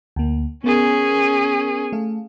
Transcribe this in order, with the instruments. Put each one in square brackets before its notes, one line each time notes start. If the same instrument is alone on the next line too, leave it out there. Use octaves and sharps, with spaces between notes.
[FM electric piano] D2 A#3
[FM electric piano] B3 A#4 [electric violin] C#4 G#4
[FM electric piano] A3 A4 F5